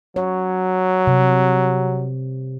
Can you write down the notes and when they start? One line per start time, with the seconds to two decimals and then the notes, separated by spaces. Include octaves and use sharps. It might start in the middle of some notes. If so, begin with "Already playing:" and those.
0.16 F#3 C#5
1.07 C3